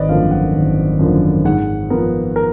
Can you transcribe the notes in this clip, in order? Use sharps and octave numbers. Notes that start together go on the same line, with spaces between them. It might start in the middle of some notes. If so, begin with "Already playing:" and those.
Already playing: G#1 B4 D5 D#5
F#2 D3 F3 A#3 F5
F#5
G#1
F#2 D3 F3 A#3
G#2 F#5
F3 B3 A#4
A#4